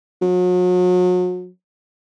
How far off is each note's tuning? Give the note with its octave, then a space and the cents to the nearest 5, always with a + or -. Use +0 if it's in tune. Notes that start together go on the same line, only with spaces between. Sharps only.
F#3 -40